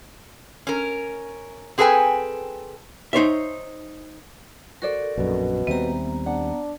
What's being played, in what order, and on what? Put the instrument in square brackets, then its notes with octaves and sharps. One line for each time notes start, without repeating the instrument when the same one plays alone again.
[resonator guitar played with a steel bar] C#4 A#4
C4 G#4 A4 B4 G5 G#5
[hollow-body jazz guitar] D#4 C5 C#5 E5
[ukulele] F#4 C5 D5 [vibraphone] A4 A#4
[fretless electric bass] A#1 F#2 [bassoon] B2
[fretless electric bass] D#2 G3 C4 [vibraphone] B3 A#5 [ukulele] E5
[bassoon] D4 [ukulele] F#5